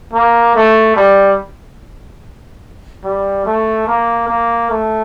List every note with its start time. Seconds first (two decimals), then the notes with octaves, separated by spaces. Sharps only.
0.13 A#3
0.55 A3
0.96 G3
3.04 G3
3.46 A3
3.87 A#3
4.28 A#3
4.70 A3